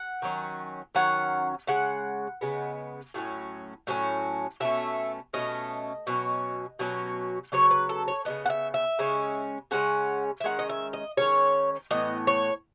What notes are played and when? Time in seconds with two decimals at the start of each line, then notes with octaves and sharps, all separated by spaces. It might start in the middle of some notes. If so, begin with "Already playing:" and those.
Already playing: F#5
0.22 D#3 F#3 C#4
0.95 D#3 F#3 C#4 F#5
1.67 C#3 G#3 F#5
2.41 C#3 G#3 B3
3.14 A2 F#3 C#4
3.87 A2 F#3 C#4
4.60 B2 A3 C#4 E5
5.33 B2 A3 C#4 D#5
6.07 B2 F#3 C#4
6.79 B2 F#3 C#4
7.52 C#3 F#3 B3 C#5
7.71 B4
7.89 A4
8.08 C#5
8.25 C#3 F#3 B3 D#5
8.46 F#5
8.50 E5
8.74 E5
8.99 C#3 G#3 C#4
9.71 C#3 G#3 C#4 F#5
10.40 E5
10.44 D#3 G#3 C#4 F#5
10.59 D#5
10.69 E5
10.93 D#5
11.17 D#3 G#3 C#4 C#5
11.91 A2 E3 B3 D#5
12.27 C#5